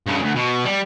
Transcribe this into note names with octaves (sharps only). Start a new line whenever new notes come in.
G2 C#3
D2
B2
G3